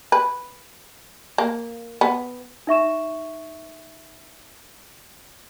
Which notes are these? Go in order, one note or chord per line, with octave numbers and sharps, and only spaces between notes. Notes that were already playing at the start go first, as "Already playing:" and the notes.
B4
A#3
B3
D#4 E5 C#6 E7